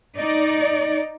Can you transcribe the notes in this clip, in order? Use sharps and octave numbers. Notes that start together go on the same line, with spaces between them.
D#4 D5